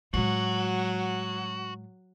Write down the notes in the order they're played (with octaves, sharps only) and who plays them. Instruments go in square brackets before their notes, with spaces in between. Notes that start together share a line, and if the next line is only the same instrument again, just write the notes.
[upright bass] A2 G#3 [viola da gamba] F#3 [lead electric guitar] F#4